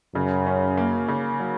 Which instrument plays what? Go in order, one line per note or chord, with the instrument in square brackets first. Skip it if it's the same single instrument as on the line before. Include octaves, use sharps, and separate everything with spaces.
[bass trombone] F#2 [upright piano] C#3
[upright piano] C#4
A#3
C#3
F#3